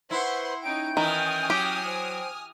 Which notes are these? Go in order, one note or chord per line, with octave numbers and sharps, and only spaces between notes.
E4 B4 C5 F#5 C6 C#6
C#4 D#4 G5 G6 D7
D#3 E3 G#5 D#6 F6
F#3 G4
C5 G5